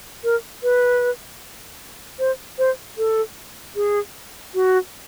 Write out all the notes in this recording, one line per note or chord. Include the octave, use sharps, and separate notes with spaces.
A#4
B4
C5
C5
A4
G#4
F#4